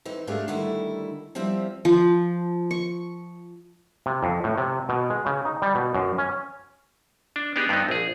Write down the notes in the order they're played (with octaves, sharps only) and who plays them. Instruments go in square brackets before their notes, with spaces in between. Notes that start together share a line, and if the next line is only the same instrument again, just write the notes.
[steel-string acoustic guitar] E3 C4 D#4
G#2 G#3 A3 D4 F4 G4
D3 D#3 G3 A3 E4
F3 G3 C4 E4 G4
[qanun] F3
C#6
[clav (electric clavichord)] C3
F2
A2
C3
B2
G#3
C#3
D#4
G3
B2
F#2
C#4
D4
B3 D4 D#4 G4 G#4
G2 B3 C4 D#4
A#1 G#4